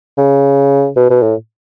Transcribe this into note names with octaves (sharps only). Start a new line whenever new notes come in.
C#3
B2
B2
A2